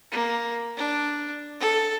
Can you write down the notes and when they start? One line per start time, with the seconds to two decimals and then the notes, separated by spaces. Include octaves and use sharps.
0.11 A#3
0.77 D4
1.60 A4